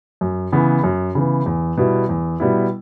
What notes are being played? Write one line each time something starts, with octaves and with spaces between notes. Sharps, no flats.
F#2
C#3 E3 B3
F#2
C#3 E3 B3
E2
B2 G3 B3 E4
E2
B2 G3 B3 E4